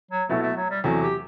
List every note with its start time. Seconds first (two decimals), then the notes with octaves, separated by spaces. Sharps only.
0.11 F#3
0.29 B2 F#3 A3 B3 E4 A4
0.43 A3
0.57 F#3
0.70 G3
0.84 E2 C3 F#3 A3
1.03 G4